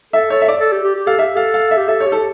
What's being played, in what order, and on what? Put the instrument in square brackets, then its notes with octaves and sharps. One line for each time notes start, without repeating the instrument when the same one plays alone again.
[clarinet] A4 [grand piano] E5
[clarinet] A4 [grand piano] C#5
[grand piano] E5
D5
[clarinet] A4
G4
G4
G4
[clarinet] A4 [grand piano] F5
[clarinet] G4 [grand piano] E5
[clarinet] A4 [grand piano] F5
[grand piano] F5
E5
[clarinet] G4
[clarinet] A4 [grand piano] E5
[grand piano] C#5
[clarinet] G4
[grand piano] A4